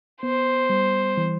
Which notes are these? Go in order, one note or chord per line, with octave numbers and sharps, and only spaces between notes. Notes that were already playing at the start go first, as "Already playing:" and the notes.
B3 C5
G3
E3